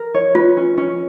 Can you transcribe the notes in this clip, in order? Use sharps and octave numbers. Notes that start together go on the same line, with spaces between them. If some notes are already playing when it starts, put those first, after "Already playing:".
Already playing: A#4
C#5
F4 B4
C#4
C#4